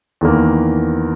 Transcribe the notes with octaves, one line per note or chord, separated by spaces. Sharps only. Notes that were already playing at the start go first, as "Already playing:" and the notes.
E2 D#3 A#3